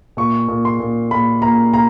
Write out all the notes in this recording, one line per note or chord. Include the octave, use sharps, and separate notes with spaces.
A#2 C#6
A#2
C6
A#2
A#2 B5
A#2 A#5
A#2 A#5